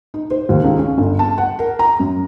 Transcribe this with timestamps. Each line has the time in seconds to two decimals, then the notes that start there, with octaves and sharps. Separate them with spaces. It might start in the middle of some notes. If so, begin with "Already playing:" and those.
0.14 D#4
0.31 C5
0.49 D#2
0.64 C#2
0.79 C#4
0.98 G1
1.19 A5
1.38 F#5
1.59 A#4
1.79 A#5
2.00 F#2